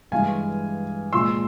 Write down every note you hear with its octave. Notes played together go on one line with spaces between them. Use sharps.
G2 E3 G#3 F5 G#5
A#2 F3 G#3 C6 E6